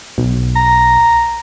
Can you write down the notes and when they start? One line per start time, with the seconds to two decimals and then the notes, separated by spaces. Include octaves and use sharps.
0.18 B1
0.56 A#5